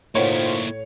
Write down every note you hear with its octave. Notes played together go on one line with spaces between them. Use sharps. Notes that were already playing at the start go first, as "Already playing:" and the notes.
A2 D#3 A#3 E4 F4 C5 C#5